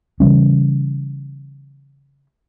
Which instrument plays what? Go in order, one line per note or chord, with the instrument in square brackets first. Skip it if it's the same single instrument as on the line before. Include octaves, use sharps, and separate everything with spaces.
[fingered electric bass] C#3 E3 G3 C#4